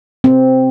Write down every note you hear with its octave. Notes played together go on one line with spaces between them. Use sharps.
C4